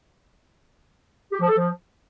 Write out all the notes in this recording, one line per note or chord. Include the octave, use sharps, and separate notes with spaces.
G4
F3
A4
F3